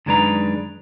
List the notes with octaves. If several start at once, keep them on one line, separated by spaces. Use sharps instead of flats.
F#2 D#3 G#3 D4 B4 A#5